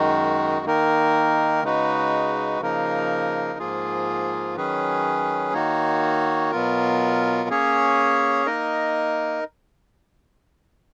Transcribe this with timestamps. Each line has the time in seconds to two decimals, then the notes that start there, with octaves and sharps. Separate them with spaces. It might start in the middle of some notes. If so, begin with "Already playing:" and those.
Already playing: F#2 D#3 G#3 D#4 F#4
0.66 D#3 A#3 D#4 A#4
1.63 C#3 G#3 D#4 F#4 B4
2.60 C#3 F3 A#3 D#4 A#4
3.59 G#2 F3 A#3 F4 G#4
4.56 D#3 F#3 C#4 G#4 B4
5.53 D#3 A#3 D#4 F#4 C#5
6.51 B2 F#3 B3 F4 A#4
7.49 A#3 C#4 G#4 C#5
8.46 A#3 D#4 A#4 D#5